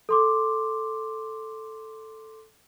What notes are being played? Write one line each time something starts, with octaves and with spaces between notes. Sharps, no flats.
A4 C6 D6